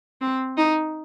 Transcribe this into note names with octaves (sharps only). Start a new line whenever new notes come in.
C4
D#4